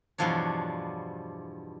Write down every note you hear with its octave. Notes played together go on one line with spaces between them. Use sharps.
E2 G2 B2 F3 D4 C#5